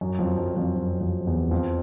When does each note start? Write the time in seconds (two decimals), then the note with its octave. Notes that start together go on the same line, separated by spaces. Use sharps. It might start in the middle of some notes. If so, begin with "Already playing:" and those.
0.01 F#2
0.19 F2
0.38 F#2
0.57 F2
0.76 F#2
1.01 F2
1.27 E2
1.51 F2